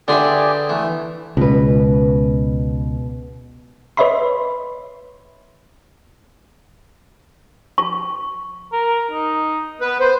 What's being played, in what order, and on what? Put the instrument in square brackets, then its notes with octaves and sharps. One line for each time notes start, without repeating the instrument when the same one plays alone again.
[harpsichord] D3 C6 [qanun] D4 B4 E5 [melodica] G4 G#4 D5
[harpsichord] E3 [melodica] A3 B3
[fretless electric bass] C#2 [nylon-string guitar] B2 B4
[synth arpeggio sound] B4 C#5 D#5 E5 B5 C6
[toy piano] C#6
[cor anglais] A#4
D#4
[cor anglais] B3 [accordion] B4
[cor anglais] B4 [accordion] C5